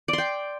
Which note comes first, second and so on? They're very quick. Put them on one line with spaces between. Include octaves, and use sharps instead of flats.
D5 C6 G5